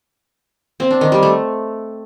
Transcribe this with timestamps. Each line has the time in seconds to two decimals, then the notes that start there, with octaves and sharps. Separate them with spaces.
0.80 C4
0.91 D4
1.01 D#3
1.12 G3
1.23 A3